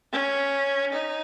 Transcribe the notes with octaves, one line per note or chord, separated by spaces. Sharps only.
C#4
D#4